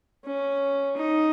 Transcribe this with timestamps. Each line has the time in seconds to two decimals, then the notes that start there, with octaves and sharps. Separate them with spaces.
0.25 C#4
0.96 D#4